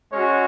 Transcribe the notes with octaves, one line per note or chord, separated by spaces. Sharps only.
G#3 C#4 F#4 C#5